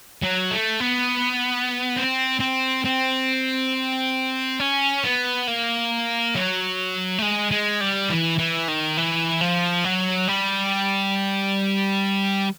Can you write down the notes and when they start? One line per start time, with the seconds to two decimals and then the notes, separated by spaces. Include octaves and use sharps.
0.22 F#3
0.51 A3
0.80 B3
1.97 C4
2.40 C4
2.85 C4
4.60 C#4
5.04 B3
5.47 A#3
6.35 F#3
7.18 A3
7.22 G#3
7.51 G#3
7.81 G3
8.10 E3
8.38 E3
8.68 D#3
8.97 E3
9.41 F3
9.84 F#3
10.28 G3